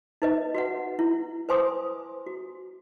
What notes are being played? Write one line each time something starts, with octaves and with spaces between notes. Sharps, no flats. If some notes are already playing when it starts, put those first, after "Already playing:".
D#4 B4 D#5
F#4 B4 F#5
E4
B4 C5 G#5 C6 D6 D#6
F#4